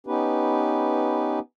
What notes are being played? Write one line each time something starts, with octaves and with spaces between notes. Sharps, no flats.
B3 C#4 D#4 G4 B4